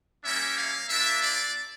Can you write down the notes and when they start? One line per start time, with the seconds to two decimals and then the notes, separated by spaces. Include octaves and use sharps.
0.24 G3 A#3 C#4 E5
0.57 F5
0.88 A#3 D4 F4 E5
1.21 D5